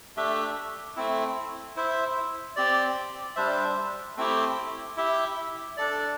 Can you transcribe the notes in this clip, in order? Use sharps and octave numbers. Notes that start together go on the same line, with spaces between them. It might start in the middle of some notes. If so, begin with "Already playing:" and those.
A3 D4 G4 E5
A3 C4 E4
E4 C5 E5
C4 G4 D5
G3 D4 C5 E5
A3 C4 E4 G4
E4 G4 E5
D4 A4 D5